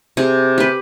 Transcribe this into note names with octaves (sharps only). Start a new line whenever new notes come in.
C3 G#4
G4 B4